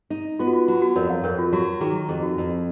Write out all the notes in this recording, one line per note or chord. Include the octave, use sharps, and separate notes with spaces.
D#4
B3 F4
F#4
F4
F#3 F4
F#4
F2 A#4 C#5
C#5 F5
F2 A#4 C#5
F4
F#3 F#4
D#3 G#4
F2 G#4
F#4
F2